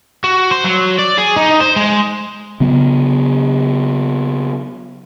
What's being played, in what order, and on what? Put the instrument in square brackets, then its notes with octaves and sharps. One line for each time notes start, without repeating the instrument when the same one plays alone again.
[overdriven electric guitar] F#4
C5
F#3
D5
G#4
D#4
C5
G#3
[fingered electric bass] C#3 F#3 B3